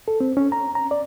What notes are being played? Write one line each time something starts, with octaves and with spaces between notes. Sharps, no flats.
A4
C4
C#4
A#5
A#5
D5